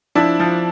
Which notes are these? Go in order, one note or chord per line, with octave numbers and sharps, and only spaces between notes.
F3 D4 E4
F3